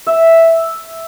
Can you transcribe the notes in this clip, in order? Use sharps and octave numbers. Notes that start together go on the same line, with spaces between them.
E5